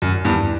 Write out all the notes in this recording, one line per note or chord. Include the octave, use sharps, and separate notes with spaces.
F#2
E2 G2